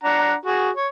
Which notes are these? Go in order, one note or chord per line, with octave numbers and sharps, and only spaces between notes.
D4 F#5 A#5
F#4 G#4
C#5